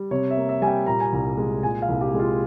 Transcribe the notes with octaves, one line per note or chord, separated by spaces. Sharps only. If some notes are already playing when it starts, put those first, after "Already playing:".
Already playing: G3
C3 C#5
E5
A#3
E5
G3 G#5
G5
A#2 A#5
G#5
C2 A#5
G#3
A#2 G#5
F5
C2
G4
G#3
F4